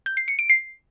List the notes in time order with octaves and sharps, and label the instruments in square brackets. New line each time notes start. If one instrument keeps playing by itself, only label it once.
[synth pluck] G6
C7
C#7
D7
C7